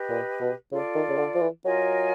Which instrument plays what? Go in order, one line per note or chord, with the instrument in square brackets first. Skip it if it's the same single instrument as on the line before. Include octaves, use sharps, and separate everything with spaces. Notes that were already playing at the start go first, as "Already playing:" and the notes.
Already playing: [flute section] G4 B4 D#5
[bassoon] A#2
B2
[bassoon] C#3 [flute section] F4 A4 D5
[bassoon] D#3
C#3
D3
F3
E3
[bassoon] F#3 [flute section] F4 A#4 D#5 G#5